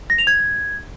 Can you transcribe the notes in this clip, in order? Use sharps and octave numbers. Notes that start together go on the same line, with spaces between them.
A#6
F7
G#6